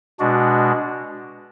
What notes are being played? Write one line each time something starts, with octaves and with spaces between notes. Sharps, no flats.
B2 G#3 D4 F#4